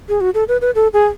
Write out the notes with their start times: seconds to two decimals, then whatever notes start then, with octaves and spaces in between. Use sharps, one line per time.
0.09 G#4
0.21 F#4
0.34 A4
0.48 B4
0.61 B4
0.75 A4
0.93 G#4